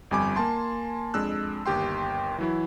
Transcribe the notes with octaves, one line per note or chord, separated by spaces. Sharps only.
G1 F2 G3 G#5 B5 D6
A#3 G#5 A5 C6
F2 G#3 D4 E6 F#6
G1 D#2 G4 G5 C6
E3 F#3 E4